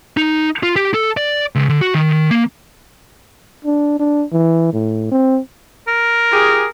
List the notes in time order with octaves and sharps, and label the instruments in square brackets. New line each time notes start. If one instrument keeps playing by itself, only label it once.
[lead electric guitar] D#4
F4
G4
A4
D5
C#2
D3
F#4
D#3
A#3
[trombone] D4
D4
E3
A2
C4
[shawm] A#4
[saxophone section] F4 G4 G#4